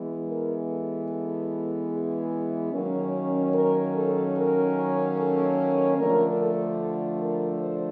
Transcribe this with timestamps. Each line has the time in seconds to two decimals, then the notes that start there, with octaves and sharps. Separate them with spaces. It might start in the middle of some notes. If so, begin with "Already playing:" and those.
Already playing: E3 G#3 B3
0.29 A#4
0.69 A4
1.09 A4
1.91 G#4
2.72 D#3 F#3 A#3 C#4
3.53 A#4
3.94 A4
4.35 A#4
5.16 A4
5.97 D3 F3 A3 D4 A#4
6.37 A4
7.19 A#4
7.60 C5